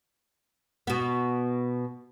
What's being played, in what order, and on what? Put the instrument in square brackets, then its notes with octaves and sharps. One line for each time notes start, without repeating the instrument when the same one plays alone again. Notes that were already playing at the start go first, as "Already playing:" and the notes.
[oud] B2 B3